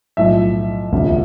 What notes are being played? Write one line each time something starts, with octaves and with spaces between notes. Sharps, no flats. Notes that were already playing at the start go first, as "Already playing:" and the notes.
B1 A2 F3 E5
E1 D2 C3 F3